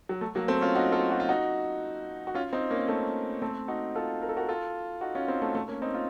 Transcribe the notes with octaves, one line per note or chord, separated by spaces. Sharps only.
F#3
A3
F#3 A#3
A3 C4
C#4 F4
D#4 F#4
F4 A4
F#4
F4
D#4 F#4
F#4
C#4 F4
C4 D#4
A#3 C#4
A3 C4
A3 C4
D#4 F#4
F4 A4
A#4
A4
F#4 A#4
F4 A4
D#4 F#4
C#4 F4
C4 D#4
A3
A3
A#3 C#4
C4 D#4
F4